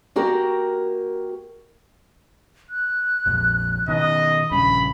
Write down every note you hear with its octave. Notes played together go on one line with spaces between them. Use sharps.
A#3 F#4 G4 A#4
F#6
A#1 F2
B2 D#3 D#5
A#1 G2 C#3 B5